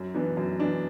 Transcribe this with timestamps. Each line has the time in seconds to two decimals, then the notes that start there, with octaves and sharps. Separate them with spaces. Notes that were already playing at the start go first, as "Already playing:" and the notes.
Already playing: F#2
0.14 E3 B3 D4
0.37 F#2
0.59 E3 B3 D4